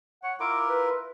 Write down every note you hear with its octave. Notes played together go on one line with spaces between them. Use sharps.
C#5 F#5
E4 F4 A#4 D6
B4